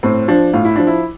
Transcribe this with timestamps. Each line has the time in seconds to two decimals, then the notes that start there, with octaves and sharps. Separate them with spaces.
0.03 A2 C4
0.28 F3 D4
0.53 A2 F4
0.65 E4
0.76 F3 D4
0.87 E4